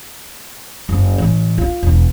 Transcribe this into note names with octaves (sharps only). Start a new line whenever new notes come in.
F#1
A1
F4
E1